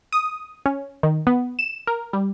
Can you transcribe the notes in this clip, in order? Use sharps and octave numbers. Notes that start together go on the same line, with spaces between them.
D#6
C#4
D#3
B3
E7
A#4
G3